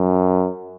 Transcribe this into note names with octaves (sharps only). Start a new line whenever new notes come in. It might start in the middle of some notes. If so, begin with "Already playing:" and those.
Already playing: F#2